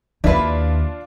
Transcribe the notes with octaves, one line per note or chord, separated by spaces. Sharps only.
D#2 D4 E4 F4 B4